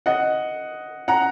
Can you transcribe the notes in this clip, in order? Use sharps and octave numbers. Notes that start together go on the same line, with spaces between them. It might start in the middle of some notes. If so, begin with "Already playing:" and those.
D#5 F#5
F#5 A#5